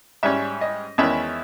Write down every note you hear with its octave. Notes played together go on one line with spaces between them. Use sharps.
G#2 G3 C#4 E5
D#5
E2 D#3 G#3 C#4 E4 E5